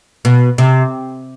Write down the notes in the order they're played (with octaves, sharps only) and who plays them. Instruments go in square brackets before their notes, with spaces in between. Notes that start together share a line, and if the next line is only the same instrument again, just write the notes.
[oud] B2
C3